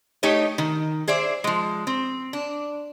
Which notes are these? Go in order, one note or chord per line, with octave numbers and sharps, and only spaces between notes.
A3 D#4 G4 C#5 D#5
D#3
G#4 C5 D5 E5
F3 G#3
C4
D4